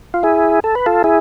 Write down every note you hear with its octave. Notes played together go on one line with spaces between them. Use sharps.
F4
E4 G#4
A4
B4
F4 A4
E4 G#4